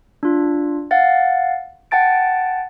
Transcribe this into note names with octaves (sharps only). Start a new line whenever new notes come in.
D4 F4
F5 F#5 A6
F#5 G5 A5 A6 D7